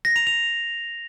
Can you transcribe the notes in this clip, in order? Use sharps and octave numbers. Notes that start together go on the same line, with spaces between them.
A#6
F7
F7